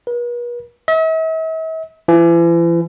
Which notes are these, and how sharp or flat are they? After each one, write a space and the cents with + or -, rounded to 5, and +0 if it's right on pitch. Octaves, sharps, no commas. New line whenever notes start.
B4 -45
E5 -45
E3 +40